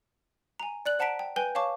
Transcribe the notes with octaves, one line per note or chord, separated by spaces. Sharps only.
G#5 A#5
D5 F#6 F#7
C5 F#5 A5 A#5 B6 D7
G5
B4 G5 G#5 G6 G7
C#5 F5 A5 C#6 D6